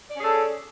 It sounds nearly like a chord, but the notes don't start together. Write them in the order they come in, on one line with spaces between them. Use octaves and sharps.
D5 C#4 G#4 A4